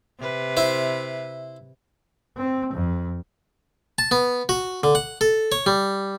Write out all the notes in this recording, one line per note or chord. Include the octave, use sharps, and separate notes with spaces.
C3 B4
E4 C5
C4
F2
A5
B3
F#4
D3
F#5
A4
C#5
G3